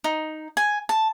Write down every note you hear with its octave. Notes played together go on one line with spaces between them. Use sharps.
D#4
G#5
A5